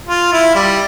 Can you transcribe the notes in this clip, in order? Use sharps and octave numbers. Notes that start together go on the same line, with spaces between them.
F4
E4
G3